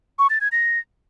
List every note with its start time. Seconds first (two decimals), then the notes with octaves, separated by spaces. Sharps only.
0.19 C#6
0.30 A6
0.41 G#6
0.52 A#6